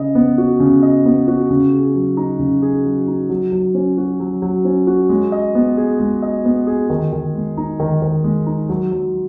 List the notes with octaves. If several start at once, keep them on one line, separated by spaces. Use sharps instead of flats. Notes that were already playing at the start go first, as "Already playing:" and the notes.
Already playing: C#3 D#5
B3
F#4
C#3
D#5
B3
F#4
C#3
G#4
F#3
D#4
C#3
G#4
F#3
D#4
F#3
F#3
C#4
F#4
F#3
F#3
C#4
F#4
G#3
D#5
B3
G#4
G#3
D#5
B3
G#4
D#3
D#3
G#3
D#4
D#3
D#3
G#3
D#4
F#3
F#3